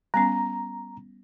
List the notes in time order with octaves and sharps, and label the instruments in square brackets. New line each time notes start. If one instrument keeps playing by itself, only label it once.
[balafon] G3 B3 C#4 [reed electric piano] A#5